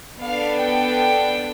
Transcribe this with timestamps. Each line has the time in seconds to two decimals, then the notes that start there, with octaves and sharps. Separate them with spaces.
0.21 B3 D4 A4 F5
0.58 G5